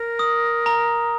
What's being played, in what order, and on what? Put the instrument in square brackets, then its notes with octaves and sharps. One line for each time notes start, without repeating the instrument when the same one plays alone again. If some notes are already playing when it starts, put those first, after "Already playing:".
Already playing: [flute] A#4
[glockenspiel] D#6
A#5